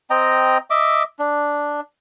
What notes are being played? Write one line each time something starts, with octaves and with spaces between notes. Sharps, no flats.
C4 D#5 G5 A#5
D#5 E5 D6
D4